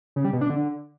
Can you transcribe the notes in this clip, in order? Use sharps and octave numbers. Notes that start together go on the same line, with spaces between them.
C#3
G3
B2
D4
D3